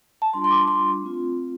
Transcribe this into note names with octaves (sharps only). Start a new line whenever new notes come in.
A5
G3 D4 F4 C6
C6
D6
C6
A3 C4 F4